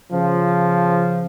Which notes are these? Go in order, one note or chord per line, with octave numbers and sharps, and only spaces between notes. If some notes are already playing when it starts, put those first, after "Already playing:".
C#3 F3